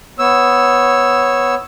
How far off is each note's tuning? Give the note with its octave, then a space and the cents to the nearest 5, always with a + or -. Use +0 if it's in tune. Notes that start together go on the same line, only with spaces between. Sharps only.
B3 +0 C#5 -10 E6 +0